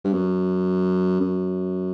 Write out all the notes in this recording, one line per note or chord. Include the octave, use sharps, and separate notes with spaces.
G2
F#2
F#2